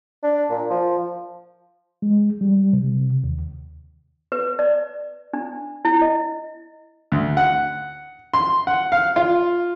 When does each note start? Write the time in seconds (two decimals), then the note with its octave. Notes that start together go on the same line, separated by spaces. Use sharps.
0.23 D4
0.50 A#2
0.70 F3
2.02 G#3
2.41 G3
2.73 C3
3.24 D#2
4.32 B4
4.59 D5
5.33 D4
5.85 E4
6.01 D#5
7.12 D2
7.37 F#5
8.34 C6
8.67 F#5
8.92 F5
9.16 F4